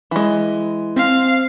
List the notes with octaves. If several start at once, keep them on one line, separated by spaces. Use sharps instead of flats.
E3 G#3
C4 F5